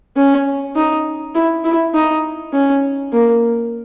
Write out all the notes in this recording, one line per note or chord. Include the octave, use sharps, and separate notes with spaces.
C#4
D#4
E4
E4
D#4
C#4
A#3